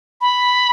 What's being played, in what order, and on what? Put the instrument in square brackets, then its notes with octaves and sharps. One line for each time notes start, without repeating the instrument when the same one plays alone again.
[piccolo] B5